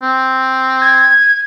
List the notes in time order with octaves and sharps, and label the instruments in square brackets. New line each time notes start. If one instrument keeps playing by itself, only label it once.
[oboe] C4
[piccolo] G#6